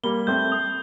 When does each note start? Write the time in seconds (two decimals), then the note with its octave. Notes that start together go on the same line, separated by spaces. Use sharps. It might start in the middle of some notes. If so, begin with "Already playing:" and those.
0.03 G3 A#3 G7
0.27 A3 C4 G6
0.52 D#6